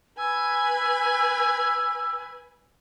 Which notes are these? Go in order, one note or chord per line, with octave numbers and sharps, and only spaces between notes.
B4 G#5 E6